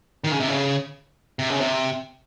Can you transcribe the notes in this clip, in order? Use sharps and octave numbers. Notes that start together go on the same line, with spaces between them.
D#3
C#3
C3
C#3
C3
C#3
C3